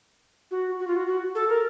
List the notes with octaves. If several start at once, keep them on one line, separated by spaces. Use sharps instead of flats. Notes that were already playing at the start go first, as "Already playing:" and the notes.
F#4
F#4
F4
F#4
F#4
A4
A#4